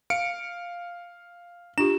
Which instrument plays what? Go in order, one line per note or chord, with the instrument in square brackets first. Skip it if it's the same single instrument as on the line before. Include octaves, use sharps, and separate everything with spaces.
[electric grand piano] F5 C#7 D7
[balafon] D4 F4 G4 [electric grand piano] E7